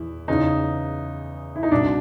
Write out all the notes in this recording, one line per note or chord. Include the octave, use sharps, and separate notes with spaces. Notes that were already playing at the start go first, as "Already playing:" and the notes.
Already playing: E2 E4
E2 C#3 E3 D#4
E4
D#4
C2 B2 D4